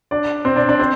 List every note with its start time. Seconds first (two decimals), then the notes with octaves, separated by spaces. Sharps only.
0.11 D4 D5
0.45 C4 C5
0.56 D4 D5
0.69 D4 D5
0.80 C4 C5